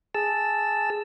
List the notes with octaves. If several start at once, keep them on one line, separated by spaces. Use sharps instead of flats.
G#4 A5 E6